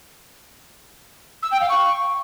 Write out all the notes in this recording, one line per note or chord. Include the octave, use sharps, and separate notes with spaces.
E6
G5
F5
C#6